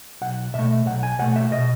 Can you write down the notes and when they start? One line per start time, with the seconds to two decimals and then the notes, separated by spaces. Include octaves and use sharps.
0.21 B1 F#5
0.54 B2 A3 E5
0.86 B1 F#5
1.03 G#5
1.19 B2 A3 F#5
1.36 E5
1.52 B2 D#5